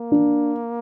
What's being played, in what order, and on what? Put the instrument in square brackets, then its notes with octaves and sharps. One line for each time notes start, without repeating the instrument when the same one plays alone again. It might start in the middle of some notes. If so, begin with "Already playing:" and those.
Already playing: [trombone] A#3
[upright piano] D4